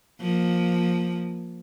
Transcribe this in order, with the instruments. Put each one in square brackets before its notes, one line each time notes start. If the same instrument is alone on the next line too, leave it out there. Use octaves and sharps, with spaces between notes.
[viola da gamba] F3 A#3